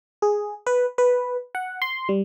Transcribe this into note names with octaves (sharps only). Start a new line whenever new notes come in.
G#4
B4
B4
F#5
C6
G3